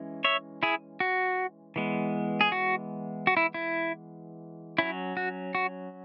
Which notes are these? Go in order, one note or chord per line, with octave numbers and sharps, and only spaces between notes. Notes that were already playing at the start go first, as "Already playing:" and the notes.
Already playing: E3 G#3 C#4
C#5 E5
E4 G#4
F#4
E3 G#3 B3
G#4
F#4
F#4
E4
E4
F#3 C#4 E4
F#4
F#4